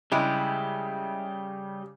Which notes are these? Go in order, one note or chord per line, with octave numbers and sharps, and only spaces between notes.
C#3 G3 G#3 E4 G4 C6